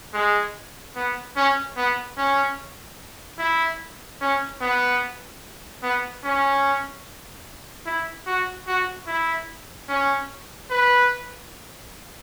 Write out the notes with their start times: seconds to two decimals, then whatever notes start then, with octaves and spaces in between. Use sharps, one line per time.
0.13 G#3
0.96 B3
1.36 C#4
1.77 B3
2.17 C#4
3.39 E4
4.21 C#4
4.61 B3
5.83 B3
6.24 C#4
7.86 E4
8.26 F#4
8.67 F#4
9.07 E4
9.89 C#4
10.70 B4